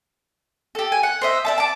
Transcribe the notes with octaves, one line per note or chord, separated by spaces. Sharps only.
G4 A4
G#5
F#5
C5 D#5 E5
D5 E5 A5
A5 D6